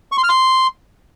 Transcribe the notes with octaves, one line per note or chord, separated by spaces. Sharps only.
C#6
C6
F6
C6